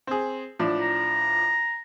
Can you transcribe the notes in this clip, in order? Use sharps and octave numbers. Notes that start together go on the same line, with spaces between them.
C4 G#4
A2 F3 D4
A#5